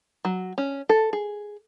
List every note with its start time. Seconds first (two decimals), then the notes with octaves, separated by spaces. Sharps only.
0.25 F#3
0.58 C#4
0.89 A4
1.13 G#4